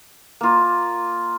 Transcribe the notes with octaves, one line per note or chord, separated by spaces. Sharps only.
A#3 F4